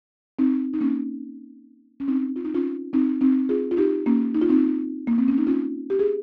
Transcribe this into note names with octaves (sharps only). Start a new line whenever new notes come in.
C4 D#4
D#4
A#3 C#4
C#4
C4 D#4
F4
D#4
C#4 F4
C4 D#4
C4 D#4
F4 G#4
F4
D#4 G4
A#3 C#4
D#4
F4
C4 D#4
A#3
C4
C#4
D#4
C#4 F4
G4
G#4